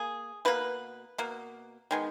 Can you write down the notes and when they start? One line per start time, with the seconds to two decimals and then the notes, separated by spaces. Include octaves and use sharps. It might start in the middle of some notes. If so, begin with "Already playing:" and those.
Already playing: A#3 G#4
0.45 B2 A#3 B4
1.18 B2 A#3
1.91 D#3 G#3 B3